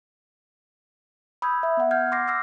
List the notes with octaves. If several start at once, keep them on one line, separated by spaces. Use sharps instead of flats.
B5 D#6 E6 G6 G#6
E5
B3 F#5
F#5 F6 G6 G#6
C6 D6 G6 A#6 C7
D6 E6 F6 A#6 C7